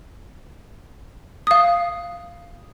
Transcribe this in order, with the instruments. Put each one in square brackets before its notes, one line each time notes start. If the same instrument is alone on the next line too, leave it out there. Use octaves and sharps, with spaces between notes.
[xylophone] F5 D#6